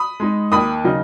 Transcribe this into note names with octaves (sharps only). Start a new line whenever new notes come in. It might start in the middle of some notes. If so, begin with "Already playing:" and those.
Already playing: B5 D#6
G#3 D#4
D#2 B5 D#6
C#3 F#3 D#4